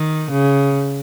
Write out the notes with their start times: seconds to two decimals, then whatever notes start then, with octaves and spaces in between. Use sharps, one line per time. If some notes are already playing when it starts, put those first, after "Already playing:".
Already playing: D#3
0.31 C#3